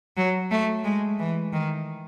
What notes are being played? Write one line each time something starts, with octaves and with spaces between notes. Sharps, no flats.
F#3
A3
G#3
E3
D#3